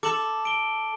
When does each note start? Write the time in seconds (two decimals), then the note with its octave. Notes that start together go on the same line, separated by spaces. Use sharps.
0.03 A4 D6 F#7
0.45 D7 G7